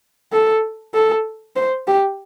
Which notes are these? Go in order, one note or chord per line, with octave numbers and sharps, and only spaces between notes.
A4
A4
C5
G4